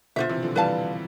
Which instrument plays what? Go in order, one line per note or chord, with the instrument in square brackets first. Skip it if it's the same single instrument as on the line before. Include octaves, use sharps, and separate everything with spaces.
[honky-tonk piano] B2 D3 [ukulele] F4 C5 E5
[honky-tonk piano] C3 E3
D3 F3
[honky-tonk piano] E3 G3 [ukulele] B4 F5 A5